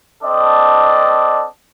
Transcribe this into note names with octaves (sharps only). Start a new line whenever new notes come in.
C4 D4 A4 D5 D#5